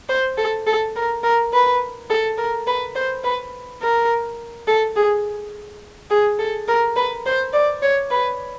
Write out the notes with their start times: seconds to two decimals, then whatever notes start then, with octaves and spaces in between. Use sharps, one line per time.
0.09 C5
0.38 A4
0.67 A4
0.96 A#4
1.24 A#4
1.53 B4
2.10 A4
2.38 A#4
2.67 B4
2.95 C5
3.24 B4
3.82 A#4
4.68 A4
4.96 G#4
6.10 G#4
6.39 A4
6.68 A#4
6.96 B4
7.26 C5
7.53 D5
7.82 C#5
8.11 B4